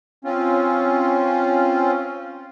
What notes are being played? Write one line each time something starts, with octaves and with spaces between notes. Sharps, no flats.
C4 C#4 F4